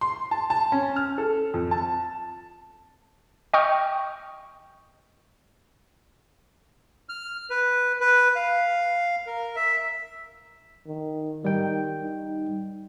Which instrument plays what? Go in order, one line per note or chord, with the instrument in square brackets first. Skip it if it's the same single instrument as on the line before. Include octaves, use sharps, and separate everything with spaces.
[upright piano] C6
A5
A5
C#4
F6
A4
F2
A5
[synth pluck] D#5 G5 C#6 D#6 F6 G6
[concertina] F6
B4
B4
F5
A#4
E5
[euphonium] D#3
[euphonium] D#3 [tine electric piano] G3 G5
[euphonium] D#4